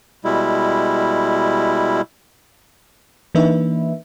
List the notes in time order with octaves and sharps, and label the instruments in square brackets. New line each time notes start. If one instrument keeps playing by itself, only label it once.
[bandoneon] B2 G3 G#3 E4
[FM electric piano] E3 A#3 D4 D#4 B4 E5